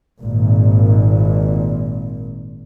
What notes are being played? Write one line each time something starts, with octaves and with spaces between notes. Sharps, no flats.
G#1 A#2